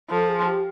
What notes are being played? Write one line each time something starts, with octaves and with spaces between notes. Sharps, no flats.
F3 A4
G#4
G4